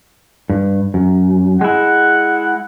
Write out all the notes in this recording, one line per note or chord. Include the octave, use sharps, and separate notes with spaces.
G2
F#2
G#3 E4 F#5